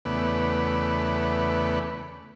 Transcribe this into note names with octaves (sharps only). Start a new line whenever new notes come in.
E2 C#3 A3 B3 B4 D5